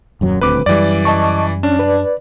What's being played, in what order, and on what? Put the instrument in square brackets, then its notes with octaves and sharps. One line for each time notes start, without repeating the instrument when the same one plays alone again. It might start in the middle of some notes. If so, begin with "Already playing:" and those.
[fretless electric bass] D#1 F#2 F#3
[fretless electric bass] D#1 D2 C4 [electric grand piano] B4 D6
[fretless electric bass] F#2 G3 [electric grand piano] E3 D5
[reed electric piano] D#5 A5 C#6
[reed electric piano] C#4 [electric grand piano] D4
[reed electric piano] B4 D5